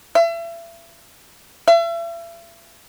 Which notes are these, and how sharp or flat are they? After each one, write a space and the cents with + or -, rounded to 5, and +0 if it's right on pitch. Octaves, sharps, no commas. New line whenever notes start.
E5 +35
E5 +40